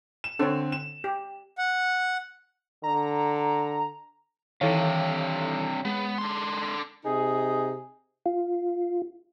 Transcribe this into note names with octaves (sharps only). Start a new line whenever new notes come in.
E7
D3 C4 A4 C#5
E7
G4
F#5
D3 A#5
G2 C3 D#3 E3 A4 C#5 F5
G#3 B3
D3 C6
C3 D#4 G#4
F4